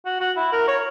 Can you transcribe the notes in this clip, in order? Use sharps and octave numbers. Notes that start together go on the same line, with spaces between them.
F#4
F#4
E4
A#4
C#5